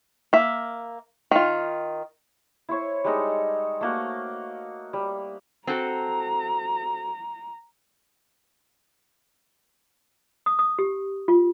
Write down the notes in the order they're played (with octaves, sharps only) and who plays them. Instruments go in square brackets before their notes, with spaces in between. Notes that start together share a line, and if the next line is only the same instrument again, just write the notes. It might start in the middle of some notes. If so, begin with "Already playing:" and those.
[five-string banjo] A#3 E5
D#3 F4
[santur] E4 C5 C#5 C#6
G3 G#3 D#4 A4
A3 A#3 F#4
G3
[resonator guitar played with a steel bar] C4 F#4 A4 [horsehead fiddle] A#5
[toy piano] D#6
D#6
G4
F4